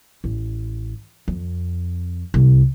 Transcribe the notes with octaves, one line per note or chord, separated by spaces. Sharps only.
A1
F2
C2